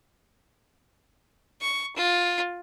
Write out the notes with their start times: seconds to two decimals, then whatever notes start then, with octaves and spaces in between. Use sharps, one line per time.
1.62 C#6
1.96 F4